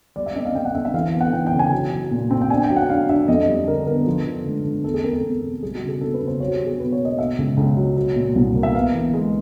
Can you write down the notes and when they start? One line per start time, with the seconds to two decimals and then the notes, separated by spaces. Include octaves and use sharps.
0.16 G3 D5
0.26 E5
0.35 C4 D#5
0.45 F5
0.55 C4 G5
0.65 F#5
0.75 C4 E5
0.85 E5
0.94 E3 F5
1.07 F5
1.14 B3
1.21 F#5
1.33 E3 G5
1.46 G5
1.53 C#3
1.59 G#5
1.72 F#3
1.92 F#3
2.11 A#2
2.31 C4
2.41 G5
2.50 D4 G#5
2.63 G5
2.70 F#3
2.76 F#5
2.89 D4 F5
3.09 D4 E5
3.28 F2 D#5
3.48 G3
3.67 D3 A#4
3.87 B3 A#4
4.06 F3
4.26 D3
4.46 A3
4.65 A3
4.84 E2 A4
4.94 G#4
5.04 C4 A#4
5.13 A4
5.23 E2
5.43 B2
5.62 G3 G#4
5.75 F#4
5.82 C#3
5.89 G#4
6.01 C4 A4
6.14 B4
6.21 C#3
6.27 C5
6.40 F#3 C#5
6.48 F#4
6.54 G4
6.60 F#3
6.67 G#4
6.80 B2 B4
6.92 C#5
7.00 A#3
7.05 D#5
7.19 B2 E5
7.38 C#2
7.57 C#2
7.77 F#3
7.97 F#3
8.16 A#2
8.36 C2
8.55 A#3
8.63 E5
8.75 B3 F5
8.95 E3
9.14 G#3